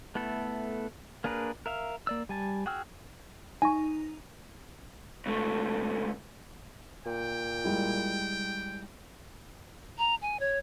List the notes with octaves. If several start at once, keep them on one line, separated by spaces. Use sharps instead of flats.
A3 B3 E4 A4
A#3 D4 G#4 A#4 B4
A#4 E5 F5
A#3 D5 E6
G3 G#5 A5
F#4 G#4 G5 E6 F6
D#4 G#5 C#6
C#2 A3
A#2 G5
G3 G#3 E4
A#5
G#5
C#5